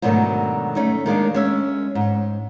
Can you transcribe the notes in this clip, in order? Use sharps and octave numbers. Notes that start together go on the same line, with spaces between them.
G#2 B2 D3 D#3 F#3 A3
A3 C#4 D#4
D#3 G#3 A#3 D4
G#3 C#4 E5
G#2